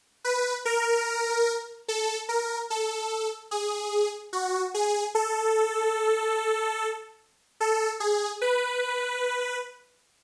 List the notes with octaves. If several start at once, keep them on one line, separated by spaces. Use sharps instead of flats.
B4
A#4
A4
A#4
A4
G#4
F#4
G#4
A4
A4
G#4
B4